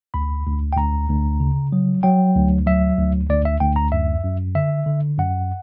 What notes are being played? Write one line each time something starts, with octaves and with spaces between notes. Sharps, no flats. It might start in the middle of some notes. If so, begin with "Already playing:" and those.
D2 B5
D2
G5
D2 A#5
D2
C#3
F#3
F#3 G5
D2
F#3 E5
D2
D2 D5
E5
D2 G5
A#5
F#2 E5
F#2
D3 E5
D3
F#2 F#5